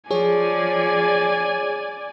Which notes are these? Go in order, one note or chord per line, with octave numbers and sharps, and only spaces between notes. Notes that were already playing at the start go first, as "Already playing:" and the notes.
F3 G#4 C#5 D5 G#5